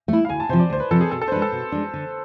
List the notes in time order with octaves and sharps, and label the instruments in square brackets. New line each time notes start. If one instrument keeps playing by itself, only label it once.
[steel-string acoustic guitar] A3 E4
[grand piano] F5
[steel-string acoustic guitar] D2 [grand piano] G#5
[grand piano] A5
[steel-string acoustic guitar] C3 F3 [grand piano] C5
[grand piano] D5
[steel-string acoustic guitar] D2 [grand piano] C5
[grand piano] B4
[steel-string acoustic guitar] C3 F3 [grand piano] A4
[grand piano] G#4
[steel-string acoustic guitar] B2 [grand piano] A4
[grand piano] A4
C5
[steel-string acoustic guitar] G#3 D4 [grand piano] B4
[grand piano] A4
[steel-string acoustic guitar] B2
G#3 D4
D3